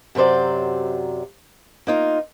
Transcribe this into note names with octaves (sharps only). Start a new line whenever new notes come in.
F#2 C3 F#3 C5 D5
A#3 D#4 F4